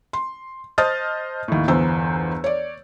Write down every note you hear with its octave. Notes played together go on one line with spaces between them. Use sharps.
C6
C5 D#5 A5 D#6 F6 A6
D#2 A2
G1 E2 C5 E6 G6
C#5 D5